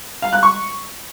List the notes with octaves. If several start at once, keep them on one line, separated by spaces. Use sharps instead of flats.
F5
F#6
C#6